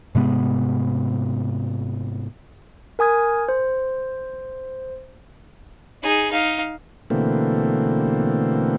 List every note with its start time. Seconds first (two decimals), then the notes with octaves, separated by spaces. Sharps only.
0.15 G#2 C3 G#3 B3
2.99 A#4 G#5 D#6 G#6
3.49 C5
6.03 D#4 G#4
6.31 D#4 F5
7.10 B2 D3 E3 A3 A#3 C4